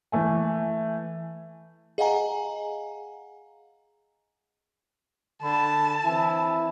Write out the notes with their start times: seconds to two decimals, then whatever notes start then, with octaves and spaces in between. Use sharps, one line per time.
0.12 E3 A3 G#5
1.98 G#4 D#5 F5 F#5 G#5 A#5
5.43 D3 A5 B5
6.05 E3 C4 E4